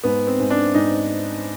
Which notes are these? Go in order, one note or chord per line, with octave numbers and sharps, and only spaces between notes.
G#2 B3
C4
G#2
D4
G#2 D#4